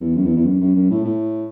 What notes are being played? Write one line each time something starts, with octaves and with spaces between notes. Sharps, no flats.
E2
F#2
E2
E2
F#2
F#2
F#2
A2
A2